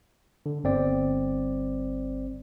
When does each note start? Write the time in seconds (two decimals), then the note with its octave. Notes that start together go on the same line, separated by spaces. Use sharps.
0.46 D3
0.64 G1 C4 D5